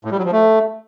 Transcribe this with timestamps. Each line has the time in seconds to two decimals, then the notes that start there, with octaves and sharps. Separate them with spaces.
0.05 A2
0.11 G3
0.18 F#3
0.25 F3
0.32 A3